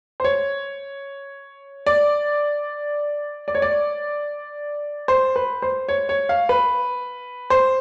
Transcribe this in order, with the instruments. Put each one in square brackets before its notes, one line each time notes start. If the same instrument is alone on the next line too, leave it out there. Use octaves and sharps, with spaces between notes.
[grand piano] C5
C#5
D5
D5
C#5
D5
C5
B4
C5
C#5
C#5
F5
B4
C5